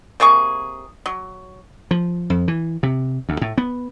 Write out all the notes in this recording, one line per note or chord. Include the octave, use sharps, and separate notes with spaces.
C3 A#3 G#4 C#6
F#3
F3
F2
E3
C3
D2
A2
B3